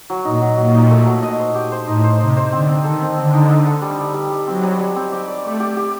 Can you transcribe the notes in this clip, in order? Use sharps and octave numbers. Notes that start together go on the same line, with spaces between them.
F#3
A#2 D#4
F#3
A#2 F#3
D#4
A3
F#3
D#5
C5
G4
C5
A2 D#4
C5
C3 D#4
C5
D3 C4
C4
D#3 A4
C4
D3 C4
D#4
D#4
A4
G3
G3
G3
G3
F#3 C4
G3
G3
C4
G4
D5
A3 D5
G4
G4